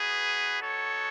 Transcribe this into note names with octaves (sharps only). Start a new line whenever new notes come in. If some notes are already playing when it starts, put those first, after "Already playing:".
Already playing: B3 D#4 F#4 G#4 B4
A4 C#5